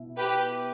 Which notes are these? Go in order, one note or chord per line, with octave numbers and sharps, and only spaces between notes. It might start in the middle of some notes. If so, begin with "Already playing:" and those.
Already playing: B2 E4
G4 B4